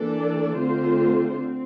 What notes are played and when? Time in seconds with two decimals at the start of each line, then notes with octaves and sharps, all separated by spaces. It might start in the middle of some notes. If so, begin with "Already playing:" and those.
Already playing: E3 A#3 D4 A4 D5
0.59 D3 A3 C4 F4 C5
1.35 C4